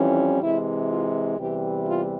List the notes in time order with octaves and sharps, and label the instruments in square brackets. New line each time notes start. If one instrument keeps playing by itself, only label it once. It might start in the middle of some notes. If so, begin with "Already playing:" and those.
Already playing: [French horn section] F2 E3 G3 C#4
C3 E3 G#3 E4
F4
E2 C3 E3 G3 G4
F4